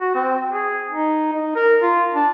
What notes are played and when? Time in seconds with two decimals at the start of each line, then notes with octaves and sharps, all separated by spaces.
0.01 F#4
0.15 C4
0.50 G#4
0.91 D#4
1.33 D#4
1.55 A#4
1.82 F4
2.14 D4